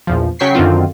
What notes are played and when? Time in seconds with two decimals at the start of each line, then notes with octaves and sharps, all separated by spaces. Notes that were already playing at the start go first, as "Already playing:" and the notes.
0.07 A#1 E2 F3
0.39 C#3 F#3 G5 C#6 B6 C7
0.55 F#2 D3 D#3 C4 F4